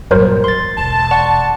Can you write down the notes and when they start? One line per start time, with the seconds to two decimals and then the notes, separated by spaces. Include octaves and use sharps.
0.11 G2 A#2 F#3 A#4 C5
0.44 E2 D3 C6 A6
0.78 E1 D3 A5
1.11 D5 F#5 C#6 E7